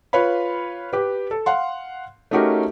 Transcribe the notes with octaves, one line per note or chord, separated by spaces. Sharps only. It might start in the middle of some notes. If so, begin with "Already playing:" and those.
F4 B4 C#5 F5 B5
G4 B4
A4
F5 F#5 C6
A3 C#4 D#4 F#4 G4 A#4